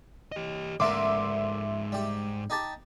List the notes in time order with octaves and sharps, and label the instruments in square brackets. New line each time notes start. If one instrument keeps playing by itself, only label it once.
[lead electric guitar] G4 D#5
[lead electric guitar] G#2 D5 [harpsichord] D3 A3 A#3 [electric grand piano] E5 C6 D6
[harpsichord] G3 G4
D#4 G4 A5